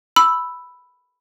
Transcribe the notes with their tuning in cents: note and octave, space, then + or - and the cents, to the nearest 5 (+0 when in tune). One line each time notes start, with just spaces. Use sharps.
B5 +5 E6 +0